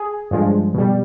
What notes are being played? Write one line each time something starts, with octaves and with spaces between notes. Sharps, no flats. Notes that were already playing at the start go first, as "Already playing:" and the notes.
Already playing: G#4
G2 F3 G#3
B2 G3